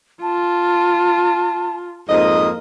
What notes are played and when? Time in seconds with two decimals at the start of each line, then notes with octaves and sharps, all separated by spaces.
0.22 F4 A5
2.09 F2 G#2 A#3 D#5